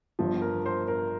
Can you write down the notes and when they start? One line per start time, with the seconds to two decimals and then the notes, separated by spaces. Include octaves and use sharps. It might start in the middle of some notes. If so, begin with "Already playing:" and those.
0.19 G1 G2 F3
0.42 A#4
0.66 C5
0.88 A#4